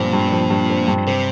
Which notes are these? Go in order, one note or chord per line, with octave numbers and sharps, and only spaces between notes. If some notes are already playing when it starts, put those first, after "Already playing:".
Already playing: G2 A#2 F3 C4
G2
F3
G2
C4
G2
C3 C4